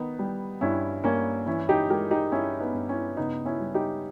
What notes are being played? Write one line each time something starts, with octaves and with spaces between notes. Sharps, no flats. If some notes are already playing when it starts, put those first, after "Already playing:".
Already playing: D#3 B3 D#4
G3
G2 C#4 E4
G2 A#3 C#4
E3 C#4 E4
D#4 G4
G#3 G4 A#4
D#4 G4
G2 C#4 E4
B3 D#4
G2
C#4 E4
C#3 B3 D#4
C#4 E4
G3
D#4 G4